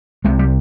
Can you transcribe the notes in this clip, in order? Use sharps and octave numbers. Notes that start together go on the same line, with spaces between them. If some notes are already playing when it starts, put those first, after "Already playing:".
C2 C3 G#3
G3